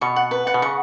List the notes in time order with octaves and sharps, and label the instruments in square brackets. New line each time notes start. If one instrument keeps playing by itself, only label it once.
[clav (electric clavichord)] B2 [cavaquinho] C#6
[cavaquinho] F#5
B4
F#5
[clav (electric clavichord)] B2
[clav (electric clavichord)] C#3 [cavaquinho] C#6